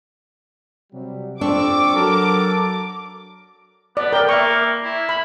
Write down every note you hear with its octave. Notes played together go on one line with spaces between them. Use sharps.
C3 F#3 G3
F2 F3 C4 D4 C#6 D6 E6
F#3 A4 A#4
B3 D5
A#4 D5 G5
A#3 E5 C#6
E4
B5